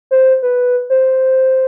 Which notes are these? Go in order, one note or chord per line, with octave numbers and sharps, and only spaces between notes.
C5
B4
C5